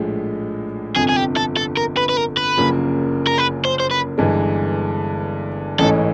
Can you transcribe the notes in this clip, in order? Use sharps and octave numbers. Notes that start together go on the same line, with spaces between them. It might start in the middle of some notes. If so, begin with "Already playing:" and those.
Already playing: A#1 A2 F3 G#3
G1 F2 C3 F3 G#4
G#4
G4
A4
A4
A#4
B4
B4
A#4
B4
F#1 F#2 C#3 F3 A#3
A#4
B4
C5
C5
B4
G1 G2 E3 G#3
A1 G#2 E3 A3 C#4 A4